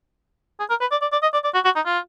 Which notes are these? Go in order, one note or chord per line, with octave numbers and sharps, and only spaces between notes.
G#4
A#4
B4
D5
D5
D5
D#5
D5
D5
F#4
F#4
D#4
F4